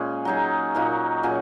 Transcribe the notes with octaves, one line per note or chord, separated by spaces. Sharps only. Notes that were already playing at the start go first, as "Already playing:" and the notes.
Already playing: A#2 G#3 C#4 G#4
F#3 D#4 G#4
A#2 A#3 D#4 F#4
A#2 F#3 C#4 G#4